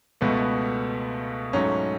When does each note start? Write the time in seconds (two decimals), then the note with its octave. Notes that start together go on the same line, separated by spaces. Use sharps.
0.21 C#2 B2 A3 B3
1.53 G#2 F#3 A3 C#4